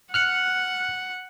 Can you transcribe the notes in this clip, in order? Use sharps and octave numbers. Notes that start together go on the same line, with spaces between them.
F#5 F6 F#6 C#7